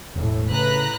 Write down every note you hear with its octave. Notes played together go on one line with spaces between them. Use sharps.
E1 A2
C#3 B4 A#5 F#6